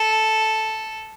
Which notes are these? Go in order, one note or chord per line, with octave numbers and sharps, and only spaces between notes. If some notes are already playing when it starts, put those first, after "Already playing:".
Already playing: A4